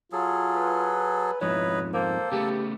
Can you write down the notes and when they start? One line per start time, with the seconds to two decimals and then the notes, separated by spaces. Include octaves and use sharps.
0.12 F#3 F4 G#4 A4
0.56 B4
1.41 F2 G#2 F3 D#4 E4 B4 C#5
1.94 A#3 A4 C5
2.32 C#3 A3 B3 G4